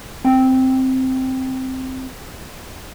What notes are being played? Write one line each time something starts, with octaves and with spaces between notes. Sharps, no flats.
C4 G5